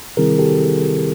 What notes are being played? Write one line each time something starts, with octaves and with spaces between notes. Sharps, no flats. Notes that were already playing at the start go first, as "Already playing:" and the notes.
C3 D#3 G3 C4 E4 G#4 A#4
G4 A4